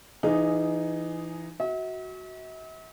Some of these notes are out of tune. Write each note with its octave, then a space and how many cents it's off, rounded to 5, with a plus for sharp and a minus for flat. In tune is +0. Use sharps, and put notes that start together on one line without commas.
E3 +25 D#4 -5 G#4 +0
F#4 +5 E5 -45